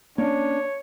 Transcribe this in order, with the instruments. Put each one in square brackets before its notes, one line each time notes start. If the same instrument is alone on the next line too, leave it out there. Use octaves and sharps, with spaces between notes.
[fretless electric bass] A#3 C#4 [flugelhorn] D4 [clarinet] C#5